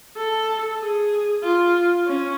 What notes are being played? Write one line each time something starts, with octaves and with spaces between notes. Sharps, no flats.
A4
G#4
F4
C#4